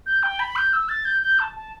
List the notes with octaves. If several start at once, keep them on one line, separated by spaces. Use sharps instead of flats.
G6
G5
B5
G6
E6
A6
G6
G6
A5
A5